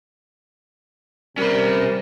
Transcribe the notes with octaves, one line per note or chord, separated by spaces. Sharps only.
C3 G3 C#4 A#4 B5